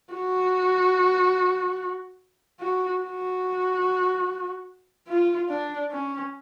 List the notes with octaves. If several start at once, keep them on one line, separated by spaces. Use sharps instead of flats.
F#4
F#4
F#4
F4
D4
C#4